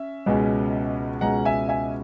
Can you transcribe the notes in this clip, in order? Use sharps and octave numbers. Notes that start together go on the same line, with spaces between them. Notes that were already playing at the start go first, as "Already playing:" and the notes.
Already playing: C#4 E5
C#2 B2 G#3 C#4
C#2 B2 G#3 C#4 F#5 A#5
E5 G#5
E5 G#5